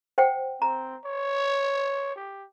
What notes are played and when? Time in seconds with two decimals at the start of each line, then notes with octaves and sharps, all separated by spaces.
0.18 C5 F#5 G5
0.62 C4 A#5
1.05 C#5
2.16 G4